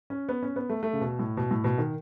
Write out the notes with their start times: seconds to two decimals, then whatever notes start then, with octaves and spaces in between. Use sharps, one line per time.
0.10 C#4
0.29 B3
0.43 C#4
0.56 B3
0.69 A3
0.83 A3
0.93 C#3
1.01 B2
1.19 A2
1.37 B2
1.51 A2
1.64 B2
1.78 D#3